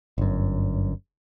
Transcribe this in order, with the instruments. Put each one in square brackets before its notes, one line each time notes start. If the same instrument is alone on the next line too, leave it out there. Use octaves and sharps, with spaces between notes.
[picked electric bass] G1 F#2